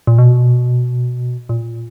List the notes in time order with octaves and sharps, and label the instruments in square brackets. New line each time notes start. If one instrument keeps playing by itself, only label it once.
[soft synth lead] A#2
B2
A#2